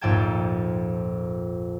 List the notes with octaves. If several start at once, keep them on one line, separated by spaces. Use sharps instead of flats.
A#1 F2 G#2 G5 A5 G#6